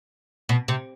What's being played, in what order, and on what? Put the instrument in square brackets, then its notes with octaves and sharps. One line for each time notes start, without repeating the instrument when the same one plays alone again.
[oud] B2
C3